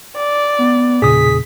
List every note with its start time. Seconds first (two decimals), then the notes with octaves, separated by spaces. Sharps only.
0.16 D5
0.58 B3
1.02 E1 A#2 C#3 G#4 D#6 B6